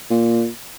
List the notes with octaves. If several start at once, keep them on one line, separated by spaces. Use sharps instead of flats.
A#2